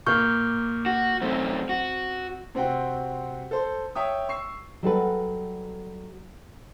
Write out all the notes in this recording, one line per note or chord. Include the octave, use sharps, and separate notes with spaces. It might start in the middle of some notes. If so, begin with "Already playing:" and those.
A#2 A#3 C#6 F6 G6
F#4
F#2 A3 C4
F#4
C3 C4 F#4 G5
A4 C5
C#5 E5 G5 D#6
C#6 E6 C7
F#3 G3 A4 B4